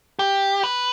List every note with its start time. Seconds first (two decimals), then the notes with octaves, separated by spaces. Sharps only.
0.19 G4
0.64 B4